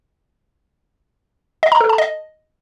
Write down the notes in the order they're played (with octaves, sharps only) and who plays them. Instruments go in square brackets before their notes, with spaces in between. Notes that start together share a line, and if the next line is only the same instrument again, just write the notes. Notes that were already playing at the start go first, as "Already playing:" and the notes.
[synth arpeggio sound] D#5
A#5
A4
A5
D#5